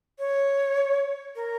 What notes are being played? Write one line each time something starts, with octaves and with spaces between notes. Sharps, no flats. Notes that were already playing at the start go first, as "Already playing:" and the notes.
C#5
A#4